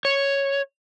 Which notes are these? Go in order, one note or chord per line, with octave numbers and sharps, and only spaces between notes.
C#5